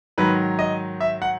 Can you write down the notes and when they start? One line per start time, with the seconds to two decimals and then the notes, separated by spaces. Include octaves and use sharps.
0.18 G#2 D#3 F#3 B4
0.59 D#5
1.01 E5
1.22 F#5